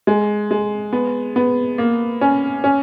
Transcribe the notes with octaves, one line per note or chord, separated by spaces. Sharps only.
G#3
G#3
B3
B3
A#3
C#4
C#4